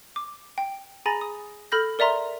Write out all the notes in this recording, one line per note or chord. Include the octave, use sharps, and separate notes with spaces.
D6
G5
G#4 G#5 A#5 B5 A6 A#6
D#6
A4 B5 F6 G6 A#6
A#4 D5 E5 A#5 C6